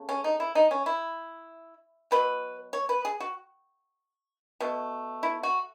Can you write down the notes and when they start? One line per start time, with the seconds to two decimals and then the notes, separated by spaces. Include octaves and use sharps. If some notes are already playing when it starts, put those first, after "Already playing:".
Already playing: C#3 A3
0.09 C#4
0.24 D#4
0.40 E4
0.55 D#4
0.71 C#4
0.86 E4
2.11 B2 F#3 B4
2.73 C#5
2.89 B4
3.05 G#4
3.20 F#4
4.60 B2 A3
5.23 E4
5.43 F#4